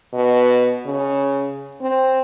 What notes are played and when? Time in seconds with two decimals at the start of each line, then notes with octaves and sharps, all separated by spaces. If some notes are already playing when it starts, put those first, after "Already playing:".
0.13 B2
0.85 C#3
1.81 C4